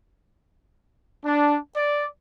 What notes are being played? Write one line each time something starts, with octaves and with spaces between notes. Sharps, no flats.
D4
D5